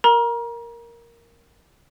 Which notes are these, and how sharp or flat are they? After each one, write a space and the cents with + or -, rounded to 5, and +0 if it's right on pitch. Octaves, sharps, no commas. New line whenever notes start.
A#4 +0 A#5 +30